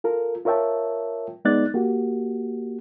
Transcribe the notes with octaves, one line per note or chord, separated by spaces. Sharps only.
F4 A4 A#4
F4 A#4 C#5 E5 G5 A5
G#3 B3 D#4 D5 F#6 A6
A#3 F#4 G4